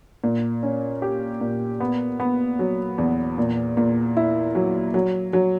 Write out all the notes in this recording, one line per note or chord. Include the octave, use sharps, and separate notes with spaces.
A#2
C#4
G4
A#2
B3
B3
F#3
E2
A#2
A#2
E4
F#3
F#3
F#3